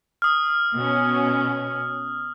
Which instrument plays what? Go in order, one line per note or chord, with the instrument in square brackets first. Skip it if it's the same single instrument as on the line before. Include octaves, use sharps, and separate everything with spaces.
[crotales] D#6 F6
[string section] B2 C#4